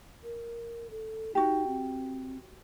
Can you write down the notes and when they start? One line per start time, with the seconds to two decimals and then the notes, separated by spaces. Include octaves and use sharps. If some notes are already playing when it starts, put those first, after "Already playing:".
0.23 A#4
0.90 A4
1.35 D#4 F#4 G4
1.67 C4